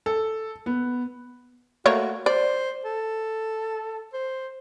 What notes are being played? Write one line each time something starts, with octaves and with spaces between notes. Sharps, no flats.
A4
B3
A3 A#3 F#4 C#5
C5 D5
A4
C5